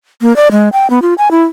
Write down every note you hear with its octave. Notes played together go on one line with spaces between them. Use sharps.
A#3
D5
G#3
G5
B3
F4
G#5
E4